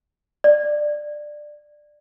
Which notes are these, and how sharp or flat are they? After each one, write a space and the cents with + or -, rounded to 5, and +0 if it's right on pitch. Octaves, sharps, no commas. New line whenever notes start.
D5 +15